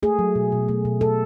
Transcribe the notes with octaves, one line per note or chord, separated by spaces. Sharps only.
A3 G#4
F#3
B2
B2
A3
B2
B2 A4